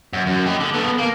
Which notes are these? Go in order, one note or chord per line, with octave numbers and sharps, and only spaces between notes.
F#2
F#2
G4 D#5
D3
B3 A4
A#3